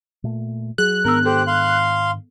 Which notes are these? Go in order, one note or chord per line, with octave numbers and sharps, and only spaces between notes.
A#2 A3
F#3 G#4 F#6
G#2 D#3 B3 D4 A#4 E6
G4 A4 C5
F5 C6